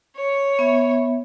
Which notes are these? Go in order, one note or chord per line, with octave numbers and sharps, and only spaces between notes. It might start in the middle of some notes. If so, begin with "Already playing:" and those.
C#5
B3 E5